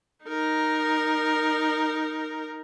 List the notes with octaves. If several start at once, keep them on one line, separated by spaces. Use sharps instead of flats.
D#4 A#4